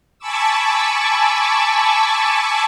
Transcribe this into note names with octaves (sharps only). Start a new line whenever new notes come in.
G#5 A5 B5 C#6 D6 E6